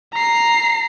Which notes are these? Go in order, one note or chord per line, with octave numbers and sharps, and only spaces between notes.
A#5 C7